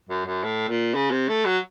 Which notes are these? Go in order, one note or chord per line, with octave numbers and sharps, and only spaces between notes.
F#2
F#2
A2
A#2
C#3
C3
A3
F#3